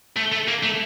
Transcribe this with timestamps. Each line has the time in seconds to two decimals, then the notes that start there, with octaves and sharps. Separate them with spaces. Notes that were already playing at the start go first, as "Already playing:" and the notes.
0.17 A3
0.32 A3
0.48 A#3
0.63 A3